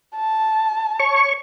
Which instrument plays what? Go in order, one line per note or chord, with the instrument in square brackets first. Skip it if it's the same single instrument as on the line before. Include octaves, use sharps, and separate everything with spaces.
[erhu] A5
[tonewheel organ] C#5 C#6